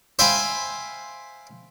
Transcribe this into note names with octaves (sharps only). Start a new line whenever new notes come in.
C5 E5 F5 G5 G#5 B5